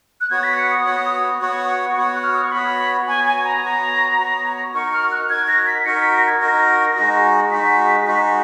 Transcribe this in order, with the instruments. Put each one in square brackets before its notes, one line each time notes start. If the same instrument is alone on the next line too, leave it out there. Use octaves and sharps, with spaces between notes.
[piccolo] F#6
[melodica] B3 F#4 C#5 F#5 [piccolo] G#6
[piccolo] B6
C#7
D#6
[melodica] B3 F#4 C#5 F#5
[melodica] B3 F#4 C#5 F#5 [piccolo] C#6
[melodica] B3 F#4 C#5 F#5
[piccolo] F#6
F6
D#6
C#6
[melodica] B3 F#4 C#5 [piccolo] B5
[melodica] B3 F#4 C#5 [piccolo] G#5
[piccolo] G#5
A#5
[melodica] B3 F#4 C#5
B3 F#4 C#5
[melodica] D#4 F#4 A#4 [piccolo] C#6
[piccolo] F6
F#6
[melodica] D#4 F#4 A#4 [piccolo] G#6
[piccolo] A#6
B6
[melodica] D#4 F#4 A#4 [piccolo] C#7
[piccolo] B6
A#6
G#6
[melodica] D#4 F#4 A#4 [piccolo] A#6
[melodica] G#3 D#4 F#4
[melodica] G#3 D#4 F#4 [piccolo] B6
[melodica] G#3 D#4 F#4